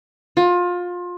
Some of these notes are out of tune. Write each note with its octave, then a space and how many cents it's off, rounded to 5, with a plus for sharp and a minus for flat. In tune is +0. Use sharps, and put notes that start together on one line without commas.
F4 +25